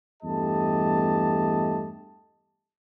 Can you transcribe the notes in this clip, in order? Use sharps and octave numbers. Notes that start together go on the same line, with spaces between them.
E2 G2 A3 G4 D#5 A5